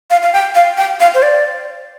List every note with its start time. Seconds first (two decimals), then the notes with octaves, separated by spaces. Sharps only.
0.10 F5
0.22 F5
0.33 G5
0.55 F5
0.78 G5
1.00 F5
1.14 C5
1.22 D5